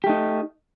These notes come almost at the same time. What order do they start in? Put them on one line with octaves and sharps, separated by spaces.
G4 A3 D#4